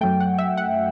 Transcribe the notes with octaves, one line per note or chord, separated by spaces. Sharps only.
F#2 F#3 A3 G5
F#5
E5
F#5